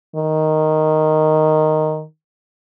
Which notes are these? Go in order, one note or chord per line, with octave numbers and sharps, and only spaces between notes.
D#3